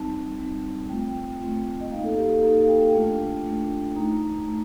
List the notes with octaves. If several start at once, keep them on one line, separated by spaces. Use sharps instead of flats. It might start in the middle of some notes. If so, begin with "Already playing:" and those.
Already playing: G3 C4 D#4 A5
G3 C4 D#4
A3 C4 F4 G5
A3 C4 F4
D#5
A#3 D#4 F5
A4
G4
A4
A#3 D#4 A4
F5
G5
A3 D4 F4
A3 D4 F4
A3 D#4 A#5
A3